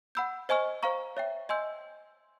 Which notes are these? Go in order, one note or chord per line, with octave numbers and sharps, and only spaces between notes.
F#5 B5 E6 G6
C5 D#5 G#5 C#6 F6
C5 F5 A#5 C#6
C#5 E5 G5
D#5 G#5 C6 E6 G6